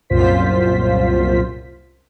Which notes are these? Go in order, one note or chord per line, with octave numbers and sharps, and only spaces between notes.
C2 F#2 A#2 F4 C5 B6